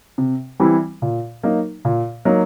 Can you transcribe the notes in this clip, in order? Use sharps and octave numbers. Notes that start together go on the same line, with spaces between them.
C3
E3 G3 C4 E4
A#2
F#3 A#3 D#4
A#2
F#3 A#3 D#4